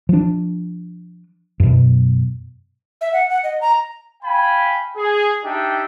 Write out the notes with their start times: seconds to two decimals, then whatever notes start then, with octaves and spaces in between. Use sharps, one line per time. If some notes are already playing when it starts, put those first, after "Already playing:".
0.09 F3 D4
1.60 F#2 B2
3.01 E5
3.13 F#5
3.29 F#5
3.44 D#5
3.61 A#5
4.23 F5 G5 G#5 B5
4.97 G#4
5.44 D4 D#4 G4 E5 G5